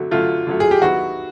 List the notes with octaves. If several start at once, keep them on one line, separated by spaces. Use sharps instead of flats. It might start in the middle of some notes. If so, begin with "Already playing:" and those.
Already playing: D3 F#3 A3
D3 F#3 A3 F4
D3 F#3 A3
G#4
G4
D#3 F#3 B3 E4 F#4